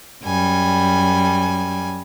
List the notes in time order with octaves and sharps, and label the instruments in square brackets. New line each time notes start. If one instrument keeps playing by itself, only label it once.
[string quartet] F#2 G3 G#5